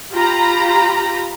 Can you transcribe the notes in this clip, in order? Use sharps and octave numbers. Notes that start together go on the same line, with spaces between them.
F4 G4 A#5 B5